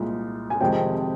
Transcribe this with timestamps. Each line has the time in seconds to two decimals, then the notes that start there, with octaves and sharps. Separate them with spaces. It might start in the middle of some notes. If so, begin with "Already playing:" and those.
Already playing: C2 A#2 G#3
0.50 G#5
0.60 F2 C3 D#3 G#3 G5